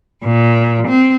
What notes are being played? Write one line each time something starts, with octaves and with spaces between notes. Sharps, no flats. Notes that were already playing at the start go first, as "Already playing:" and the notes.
A#2
C4